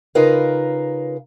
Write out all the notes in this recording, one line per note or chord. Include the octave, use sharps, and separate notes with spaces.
C#3 D#4 F4 A#4 B4 F5